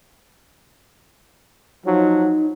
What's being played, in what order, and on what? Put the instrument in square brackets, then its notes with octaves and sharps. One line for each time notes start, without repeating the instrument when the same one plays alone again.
[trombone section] F3 F#3 [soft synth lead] D#4